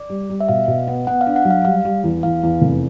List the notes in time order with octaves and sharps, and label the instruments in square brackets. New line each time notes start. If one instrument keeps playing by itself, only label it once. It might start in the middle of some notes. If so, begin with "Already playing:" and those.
Already playing: [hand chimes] D5
[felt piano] G3
G3
[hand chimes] E5
[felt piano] B2 [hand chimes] F5
[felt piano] B2
B3
[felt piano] B3 [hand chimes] F#5
[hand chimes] F5
[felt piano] D4
[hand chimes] F#5
[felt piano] F#3
[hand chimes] F5
[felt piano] G3 [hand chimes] F5
[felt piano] G3
E2
[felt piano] E2 [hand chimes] F5
[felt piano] E2
F1